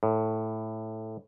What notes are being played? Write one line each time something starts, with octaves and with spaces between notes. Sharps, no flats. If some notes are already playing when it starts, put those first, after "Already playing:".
A2